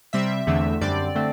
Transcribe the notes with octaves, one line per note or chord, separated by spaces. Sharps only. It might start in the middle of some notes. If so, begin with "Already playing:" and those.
C3 G3 C4 E5
E2 D3 A3 C4
F#2 D3 G3 C4 D5
D3 A3 C4